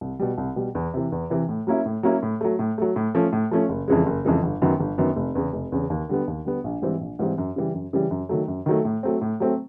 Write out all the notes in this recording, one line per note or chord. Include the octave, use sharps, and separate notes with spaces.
C2
B2 G3
C2
B2 G3
E2
C3 E3
E2
C3 E3
A2
F#3 A#3 C#4 E4
A2
F#3 A#3 C#4 E4
A2
F#3 A3
A2
F#3 A3
A2
F3 A3 C#4
A2
F3 A3 C#4
F#1
F2 C#3 E3 G#3
F#1
F2 C#3 E3 G#3
G1
F#2 D#3 F#3 B3
G1
F#2 D#3 F#3 B3
F1
E2 C#3
F1
E2 C#3
D#2
D3 G3 B3
D#2
D3 G3 B3
A#1
G#2 E3 G3 C4
A#1
G#2 E3 G3 C4
F#2
C#3 E3 G3
F#2
C#3 E3 G3
F#2
D#3 F#3 A3
F#2
D#3 F#3 A3
A2
F#3 A3 C4
A2
F#3 A3 C4